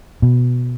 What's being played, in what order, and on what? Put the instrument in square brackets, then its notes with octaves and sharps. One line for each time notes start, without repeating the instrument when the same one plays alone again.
[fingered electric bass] B2